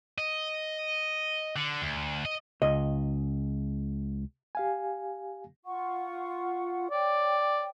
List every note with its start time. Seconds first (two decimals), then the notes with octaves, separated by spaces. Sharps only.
0.18 D#5
1.56 D3
1.82 D2
2.25 D#5
2.62 C#2 D#5
4.55 G4 F5 G#5
5.65 F4 F#5 C#6
6.91 C#5 D5 G5